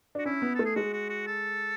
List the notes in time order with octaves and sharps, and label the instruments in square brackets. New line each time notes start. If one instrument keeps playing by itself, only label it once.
[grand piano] D4 [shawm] F#4
[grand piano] C#4 [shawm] E4
[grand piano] B3
[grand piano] A3 [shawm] A4
[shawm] G#4
[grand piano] G#3 [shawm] F#4
[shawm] F#4
F#4
A4